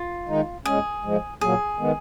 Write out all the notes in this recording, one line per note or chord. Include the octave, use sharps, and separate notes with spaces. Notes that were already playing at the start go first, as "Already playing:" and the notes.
Already playing: F4
D#3 G#3 D#4
A#2 G#3 C#4 G#4
G#2 F3 G#3
A#2 F#3 A#3 G#4
D#3 G#3 B3